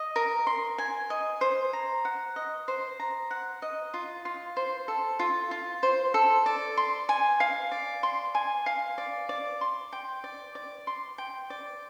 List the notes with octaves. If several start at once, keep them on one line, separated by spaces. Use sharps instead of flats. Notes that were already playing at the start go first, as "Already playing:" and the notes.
Already playing: D#5
A#4
C6
G#5
D#5
C5
A#5
F#5
D#5
C5
A#5
F#5
D#5
F4
F4
C5
A4
F4
F4
C5
A4
D5
C6
G#5
F5
D5
C6
G#5
F5
D5
D5
C6
G5
D5
D5
C6
G5
D5